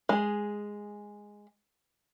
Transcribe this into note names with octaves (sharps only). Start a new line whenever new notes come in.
G#3 G#4